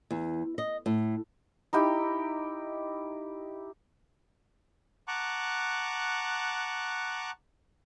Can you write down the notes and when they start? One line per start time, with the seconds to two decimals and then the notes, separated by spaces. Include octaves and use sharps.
0.11 E2
0.58 D#5
0.86 A2
1.73 D#4 E4 G4 G5
5.08 F#5 A5 A#5 C#6 D6 F#6